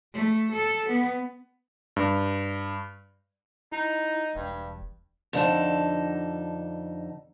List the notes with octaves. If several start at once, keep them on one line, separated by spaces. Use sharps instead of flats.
A3
A4
B3
G2
D#4 E4
E1 G2
F2 D3 D#4 A5